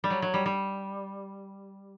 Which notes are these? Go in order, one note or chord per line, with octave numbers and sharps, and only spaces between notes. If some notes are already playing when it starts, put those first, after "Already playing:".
G3
F#3
F#3
G3
G3